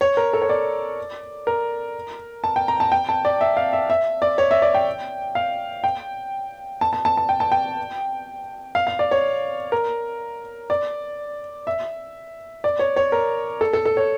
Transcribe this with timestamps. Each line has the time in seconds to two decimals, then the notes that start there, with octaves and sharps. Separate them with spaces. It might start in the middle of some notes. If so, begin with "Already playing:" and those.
0.01 C#5
0.17 A#4
0.33 A4
0.42 C#5
0.49 D5
1.47 A#4
2.44 A5
2.56 G5
2.68 A#5
2.80 A5
2.92 G5
3.09 A5
3.25 D5
3.41 E5
3.57 F5
3.73 E5
3.90 E5
4.22 D5
4.38 C#5
4.51 E5
4.62 D5
4.74 G5
5.35 F5
5.84 G5
6.81 A5
6.93 A5
7.05 A5
7.17 A5
7.29 G5
7.40 A5
7.52 G5
8.75 F5
8.87 F5
8.99 D5
9.11 C#5
9.72 A#4
10.70 D5
11.67 E5
12.64 D5
12.79 C#5
12.96 C#5
13.12 A#4
13.61 A4
13.73 A4
13.86 A4
13.97 C#5